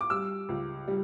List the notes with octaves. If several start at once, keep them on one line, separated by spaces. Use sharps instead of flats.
D6
G3 E6
C#2
G3